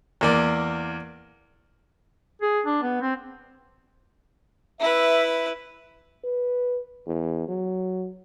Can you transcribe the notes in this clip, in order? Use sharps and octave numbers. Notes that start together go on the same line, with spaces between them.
E2 A#3 D5
G#4
D4
B3
C4
E4 B4 E5
B4
E2
F#3